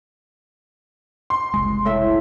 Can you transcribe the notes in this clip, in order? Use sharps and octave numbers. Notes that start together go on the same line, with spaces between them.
C6
F#1 C2 G#3
A2 A3 A4 E5